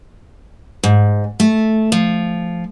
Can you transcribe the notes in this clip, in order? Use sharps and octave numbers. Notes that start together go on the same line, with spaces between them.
G#2
A3
F3